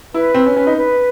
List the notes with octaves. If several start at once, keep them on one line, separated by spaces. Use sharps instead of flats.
E4 B4
C4
C#4
C#4
D#4
B4